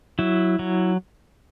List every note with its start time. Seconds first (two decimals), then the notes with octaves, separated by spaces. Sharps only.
0.19 F#3 E4
0.59 F#3